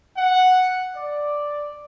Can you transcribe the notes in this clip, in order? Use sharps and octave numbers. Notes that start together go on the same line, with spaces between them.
F#5
D5